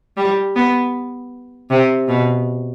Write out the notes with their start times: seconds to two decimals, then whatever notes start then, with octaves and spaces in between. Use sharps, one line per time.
0.17 G3
0.56 B3
1.70 C3
2.08 B2